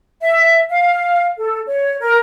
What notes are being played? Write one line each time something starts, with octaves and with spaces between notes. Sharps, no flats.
E5
F5
A4
C#5
A#4